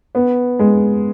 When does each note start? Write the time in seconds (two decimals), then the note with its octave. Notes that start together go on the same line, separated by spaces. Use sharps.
0.15 B3
0.59 G#3